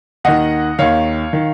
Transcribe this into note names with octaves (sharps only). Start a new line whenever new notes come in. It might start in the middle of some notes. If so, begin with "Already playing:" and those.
D#2 D#3 D#5 F#5
D#2 D#3 C#5 F5
D#3